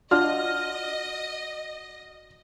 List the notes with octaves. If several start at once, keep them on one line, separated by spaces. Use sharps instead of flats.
D4 F4 F#4 D5 D#5 F#5 F6